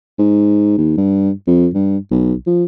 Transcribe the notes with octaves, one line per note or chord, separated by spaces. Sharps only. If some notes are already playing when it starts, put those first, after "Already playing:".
G#2
D#2
G2
F2
G2
B1
F3